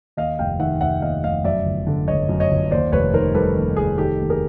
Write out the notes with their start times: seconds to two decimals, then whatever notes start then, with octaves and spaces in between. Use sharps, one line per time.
0.17 D#2 D#5 F5
0.39 F1 F5 G5
0.59 D#3 E5 F#5
0.81 F1 E5 F#5
1.02 D#2 D#5 F5
1.24 F1 D#5 F5
1.44 F#2 D5 E5
1.66 G1
1.87 D3
2.08 G1 C#5 D#5
2.29 F#2
2.40 C#5 D#5
2.51 G1
2.71 D#2 C5 D5
2.92 F1 B4 C#5
3.14 D#3 A#4 C5
3.34 G3 A4 B4
3.56 D#2
3.77 F1 G#4
3.98 D#3 G4 A4
4.20 D#2
4.30 G#4 A#4